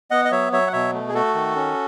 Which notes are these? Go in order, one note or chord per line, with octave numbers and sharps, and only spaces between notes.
B3 D#5 F#5
D#5
F#3 C#5 E5
F#3 C#5 E5
F#5
B2 C#5 E5
A3
G#4
A3 F#4 A4
D#3
C#4